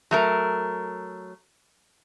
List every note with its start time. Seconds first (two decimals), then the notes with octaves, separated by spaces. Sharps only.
0.11 F#3 A3 A#4